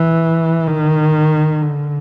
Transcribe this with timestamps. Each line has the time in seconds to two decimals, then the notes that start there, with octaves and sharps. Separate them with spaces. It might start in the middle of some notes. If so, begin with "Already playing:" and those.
Already playing: E3
0.67 D#3
1.61 D3